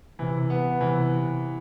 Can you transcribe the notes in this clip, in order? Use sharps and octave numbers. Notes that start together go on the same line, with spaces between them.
C3 E3
B3
C3 E3